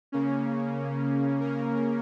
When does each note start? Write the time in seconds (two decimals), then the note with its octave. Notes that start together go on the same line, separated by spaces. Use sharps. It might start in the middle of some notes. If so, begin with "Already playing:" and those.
0.12 C#3 A#3 C#4
1.40 C#3 A#3 C#4 A#4